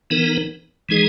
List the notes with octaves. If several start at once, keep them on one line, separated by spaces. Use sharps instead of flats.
E3 B3 D#4 A#4
E3 G#3 D#4 G#4